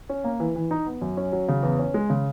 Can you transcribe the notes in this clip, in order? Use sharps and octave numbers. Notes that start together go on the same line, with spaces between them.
C#4
A#3
E3
E3
D#4
B3
F#2
C#4
F#3
C#3
E2
C#4
G#3
C#3